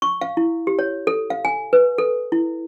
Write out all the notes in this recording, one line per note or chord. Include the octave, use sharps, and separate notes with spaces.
C#6
F5
E4
G4
C#5
A4
F5
G#5
B4
A4
E4